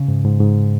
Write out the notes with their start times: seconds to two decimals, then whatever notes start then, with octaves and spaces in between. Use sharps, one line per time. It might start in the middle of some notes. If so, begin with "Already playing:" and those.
Already playing: C#3
0.08 G#2
0.24 G#2
0.40 G#2